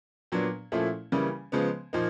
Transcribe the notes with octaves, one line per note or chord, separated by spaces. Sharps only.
A#2 F#3 B3 D4
A#2 F3 A3 C#4 E4
C#3 E3 G3 A#3 C#4
C#3 F3 G#3 B3
A#2 F3 A#3 D#4